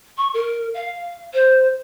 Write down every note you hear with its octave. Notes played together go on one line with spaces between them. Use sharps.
C#6
A#4
F5
C5